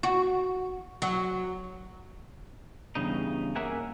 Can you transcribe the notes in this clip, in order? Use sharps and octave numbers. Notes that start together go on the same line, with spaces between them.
F#4
F#3
E2 G2 C#3 D#4
A#3 C#4 A#4 E5 F#5 G#5